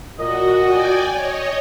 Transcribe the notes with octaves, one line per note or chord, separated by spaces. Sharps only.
A#2 F#4 D#5
D5 G5 G#5
C#5 D#5